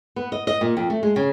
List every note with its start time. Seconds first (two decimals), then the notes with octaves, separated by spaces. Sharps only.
0.16 B3
0.32 D#5
0.47 D#5
0.61 A#2
0.77 F2
0.90 A3
1.03 G#3
1.16 C#3